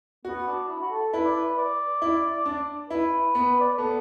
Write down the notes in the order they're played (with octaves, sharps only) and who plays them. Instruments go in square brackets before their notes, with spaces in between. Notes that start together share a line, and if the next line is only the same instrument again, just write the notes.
[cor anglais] B3 [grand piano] F#4
[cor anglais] D4
E4
F#4
A4
[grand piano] E4 [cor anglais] B4
[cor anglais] D5
B4
D5
[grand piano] E4
D4
[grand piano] E4 [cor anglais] B4
[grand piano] B3
[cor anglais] D5
B4
[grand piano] B3 [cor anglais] A4